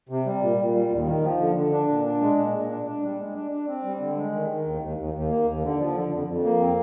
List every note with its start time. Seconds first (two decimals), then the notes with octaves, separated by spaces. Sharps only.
0.09 C3
0.26 G3
0.42 A#2
0.58 A#2
0.75 G3
0.91 D#2
1.07 D#3
1.23 F3
1.39 D3
1.56 D3
1.72 D4
1.88 A#2
2.05 D4
2.21 G#3
2.38 A#2
2.53 A#2
2.70 D4
2.86 D4
3.03 G3
3.19 G#3
3.35 D4
3.51 D4
3.68 C4
3.84 G3
4.00 D3
4.17 G#3
4.32 D#3
4.49 D#3
4.65 D#2
4.81 D#2
4.98 D#2
5.14 D#2
5.30 A#3
5.47 D#2
5.63 D3
5.79 F3
5.95 D3
6.11 F2
6.28 F2
6.44 A#3
6.60 C4